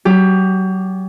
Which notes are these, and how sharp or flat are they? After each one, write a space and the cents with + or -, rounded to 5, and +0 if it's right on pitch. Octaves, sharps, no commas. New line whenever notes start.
F#3 +35 G4 +20